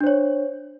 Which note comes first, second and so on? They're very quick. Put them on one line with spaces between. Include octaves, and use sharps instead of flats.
D4 C5 C#5